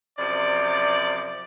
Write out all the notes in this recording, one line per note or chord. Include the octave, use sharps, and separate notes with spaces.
F#2 C3 F3 D5